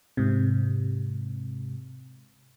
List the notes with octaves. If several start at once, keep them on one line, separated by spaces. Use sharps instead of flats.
G#2 C3